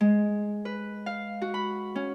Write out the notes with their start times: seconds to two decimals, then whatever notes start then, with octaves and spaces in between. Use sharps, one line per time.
0.01 G#3
0.65 B4
1.06 F5
1.42 F#4
1.54 B5
1.95 C#4